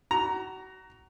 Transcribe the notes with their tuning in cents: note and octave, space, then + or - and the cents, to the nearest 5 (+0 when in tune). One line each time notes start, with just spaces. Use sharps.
F#4 +30 A#5 +0